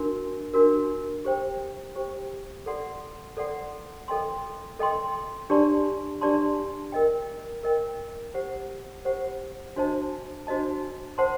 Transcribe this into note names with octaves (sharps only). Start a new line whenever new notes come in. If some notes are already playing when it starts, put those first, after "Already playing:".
Already playing: D4 F#4 A#4
D4 F#4 A#4
G4 C5 G5
G4 C5 G5
A4 D5 F#5 C6
A4 D5 F#5 C6
A4 D#5 G5 C6
A4 D#5 G5 C6
D4 G4 D5 A5 C6
D4 G4 D5 A5 C6
A#4 D#5 G5
A#4 D#5 G5
G4 C5 F#5
G4 C5 F#5
D4 F#4 C5 D#5 A5
D4 F#4 C5 D#5 A5
C5 F#5 A5 C6